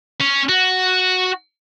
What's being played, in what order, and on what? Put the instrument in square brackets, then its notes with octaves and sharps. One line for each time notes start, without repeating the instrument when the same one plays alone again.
[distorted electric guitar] C#4
F#4